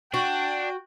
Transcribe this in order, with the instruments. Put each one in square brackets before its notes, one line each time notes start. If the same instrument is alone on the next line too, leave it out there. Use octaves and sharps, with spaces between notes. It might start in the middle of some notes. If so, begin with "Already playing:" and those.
[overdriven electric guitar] D4 [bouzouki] F#4 [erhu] G5